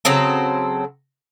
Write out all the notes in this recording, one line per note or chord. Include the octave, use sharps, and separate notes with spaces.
C#3 F#3 C4 A4